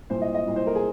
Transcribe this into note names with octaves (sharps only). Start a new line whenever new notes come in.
C2 A#2 C5
D#5
D#5
C2 A#2
C5
A#4
G#4